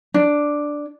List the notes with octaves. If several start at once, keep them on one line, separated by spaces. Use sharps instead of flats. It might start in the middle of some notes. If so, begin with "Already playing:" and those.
D4